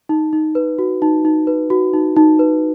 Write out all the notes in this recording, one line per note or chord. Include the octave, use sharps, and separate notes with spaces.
D#4
D#4
B4
F#4
D#4
D#4
B4
F#4
D#4
D#4
B4